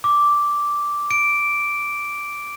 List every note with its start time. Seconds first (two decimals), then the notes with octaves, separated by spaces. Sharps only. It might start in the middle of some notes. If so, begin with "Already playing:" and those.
0.04 D6
1.11 D7